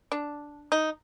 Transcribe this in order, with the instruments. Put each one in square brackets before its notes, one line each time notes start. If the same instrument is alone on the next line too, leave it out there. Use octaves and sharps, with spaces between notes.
[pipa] D4
D#4